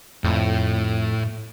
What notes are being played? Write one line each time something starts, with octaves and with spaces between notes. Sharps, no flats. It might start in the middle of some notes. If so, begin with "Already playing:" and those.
F2 A2